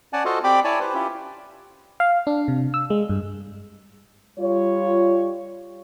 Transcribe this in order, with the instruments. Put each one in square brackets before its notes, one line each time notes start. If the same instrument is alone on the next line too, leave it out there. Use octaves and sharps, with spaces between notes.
[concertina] C#4 D5 F#5 G#5 A5
F4 F#4 A4 C5 D#5 F5
C4 G4 D5 G5 B5 D6
E4 C#5 D5 G#5 A5
G4 B4 C5
C#4 E4 F4 G4
[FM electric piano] F5
D4
C3
E6
G#3
G2
[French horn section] G3 F4 C#5